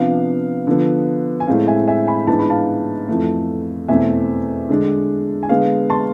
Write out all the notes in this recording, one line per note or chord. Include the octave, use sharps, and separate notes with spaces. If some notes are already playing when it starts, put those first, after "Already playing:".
Already playing: C3 F3 B3 D4 F5
D3 F3 B3
G#5
A2 G#3 C4 F5
E5 G#5
E5 G#5
G#5 B5
G#2 E3 B3 D4 A5
B5
F5 A5
F2 E3 A3
E2 B2 A3 C4 E5 G#5
D3 G#3 D4
G#5
D3 G#3 B3 F5
A5 C6